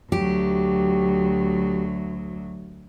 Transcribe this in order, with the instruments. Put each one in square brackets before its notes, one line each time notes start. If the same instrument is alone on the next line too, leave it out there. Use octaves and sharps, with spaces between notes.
[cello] D2 F#3 [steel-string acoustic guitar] G4